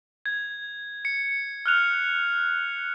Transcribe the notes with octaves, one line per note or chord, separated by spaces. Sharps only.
G#6
C#7
F6 F#6 F7